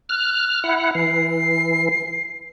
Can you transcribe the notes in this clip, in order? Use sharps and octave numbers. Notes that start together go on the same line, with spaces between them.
F6 F#6
E4 F#5
E3 C7